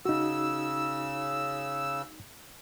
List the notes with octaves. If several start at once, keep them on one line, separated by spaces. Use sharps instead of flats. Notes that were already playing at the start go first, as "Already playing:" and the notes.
C#3 D#4 F#4 E6